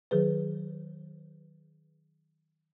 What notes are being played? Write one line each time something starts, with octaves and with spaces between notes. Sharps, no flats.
D#3 F#3 G#4 B4